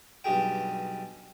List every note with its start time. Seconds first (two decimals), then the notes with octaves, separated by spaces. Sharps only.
0.24 B1 G2 G4 G#4 G5